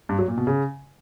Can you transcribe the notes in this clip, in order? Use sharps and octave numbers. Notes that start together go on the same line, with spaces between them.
G2
F#3
A#2
B2
C#3